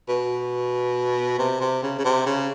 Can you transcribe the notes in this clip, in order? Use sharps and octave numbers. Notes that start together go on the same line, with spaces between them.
B2
C3
C3
C#3
C#3
C3
C#3